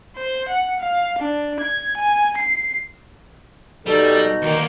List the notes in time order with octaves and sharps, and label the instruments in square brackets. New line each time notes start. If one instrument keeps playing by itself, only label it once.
[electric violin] C5
F#5
F5
D4
G#6
G#5
C7
[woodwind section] B2 D#4 [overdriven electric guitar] G3 [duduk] A4
[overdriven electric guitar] D2 A#3 [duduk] D#3